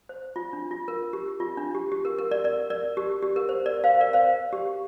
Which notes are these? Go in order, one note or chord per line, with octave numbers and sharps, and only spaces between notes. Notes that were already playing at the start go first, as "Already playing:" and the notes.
C5
F4
D4
F4
A#4
G4
F4
D4
G4
G4
A#4
A#4
A#4 D5
A#4 D5
A#4 D5
G4
G4
A#4
C5
A#4 D5
C5 F5
A#4 D5
C5 F5
G4